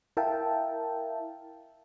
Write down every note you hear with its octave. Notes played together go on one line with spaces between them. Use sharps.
E4 A#4 E5 F5 G5 A5